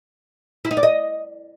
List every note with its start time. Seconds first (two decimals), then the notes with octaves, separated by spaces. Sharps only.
0.65 E4
0.71 D#4
0.77 D5
0.83 D#5